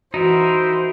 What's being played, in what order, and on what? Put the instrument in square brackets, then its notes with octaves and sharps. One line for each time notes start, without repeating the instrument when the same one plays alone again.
[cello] E3 [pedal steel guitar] D#4 E4 A#4 [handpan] F#4 [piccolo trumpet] C5